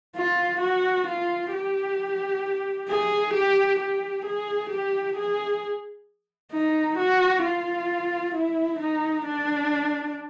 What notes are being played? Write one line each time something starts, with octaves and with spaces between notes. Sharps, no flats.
F4
F#4
F4
G4
G#4
G4
G4
G#4
G4
G#4
D#4
F#4
F4
E4
D#4
D4